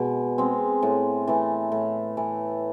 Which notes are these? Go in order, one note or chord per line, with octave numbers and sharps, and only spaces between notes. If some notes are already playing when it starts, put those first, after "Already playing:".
Already playing: B2 G#3
G#3 C4
A2
E3 A3
A2
E3 A3